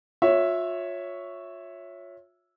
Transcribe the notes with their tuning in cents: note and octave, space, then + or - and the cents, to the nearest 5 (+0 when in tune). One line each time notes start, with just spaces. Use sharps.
F4 +35 C#5 +0 E5 +0